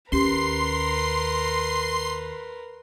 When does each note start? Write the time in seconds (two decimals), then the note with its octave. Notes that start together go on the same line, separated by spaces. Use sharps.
0.12 D#2 C#4 G4 A#4 B4 C6 C7